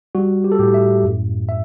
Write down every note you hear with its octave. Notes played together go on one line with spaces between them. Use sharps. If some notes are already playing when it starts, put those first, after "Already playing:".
G3 F#4
G4
A4
A2 G4
E5
F#2
E5